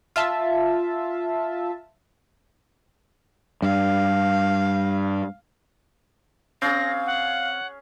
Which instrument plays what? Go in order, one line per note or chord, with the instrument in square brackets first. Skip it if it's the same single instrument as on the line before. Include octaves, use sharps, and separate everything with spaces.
[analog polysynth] F4 E5 A5
[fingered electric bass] G2 [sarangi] F5
[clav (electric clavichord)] C4 [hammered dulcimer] C#4 G#4 [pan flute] F5 [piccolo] A#6
[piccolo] F#5